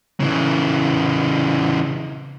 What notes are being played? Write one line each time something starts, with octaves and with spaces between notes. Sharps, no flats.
C#3 E3